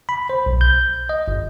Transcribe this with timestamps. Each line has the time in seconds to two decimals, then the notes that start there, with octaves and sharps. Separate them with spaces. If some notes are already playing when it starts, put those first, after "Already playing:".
0.09 B5
0.30 C5
0.46 B1
0.61 G6
1.09 D#5
1.28 G1